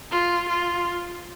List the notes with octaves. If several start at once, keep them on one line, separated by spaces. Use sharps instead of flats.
F4
F4